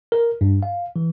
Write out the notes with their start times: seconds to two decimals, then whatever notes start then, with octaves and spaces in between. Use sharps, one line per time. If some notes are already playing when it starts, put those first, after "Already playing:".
0.12 A#4
0.41 G2
0.63 F5
0.96 E3